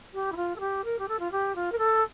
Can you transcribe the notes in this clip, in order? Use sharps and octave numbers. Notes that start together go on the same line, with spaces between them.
G4
E4
F4
A4
G4
A#4
G4
A4
F4
G4
F4
A#4
A4